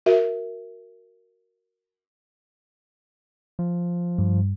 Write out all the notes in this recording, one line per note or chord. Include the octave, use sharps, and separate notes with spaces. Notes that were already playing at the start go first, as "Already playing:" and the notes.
F#4 A#4 E5
F3
G2